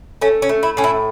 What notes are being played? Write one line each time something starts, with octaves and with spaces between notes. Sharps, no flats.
A3 C#4
C#4
A3
E4
A2 C#4
E4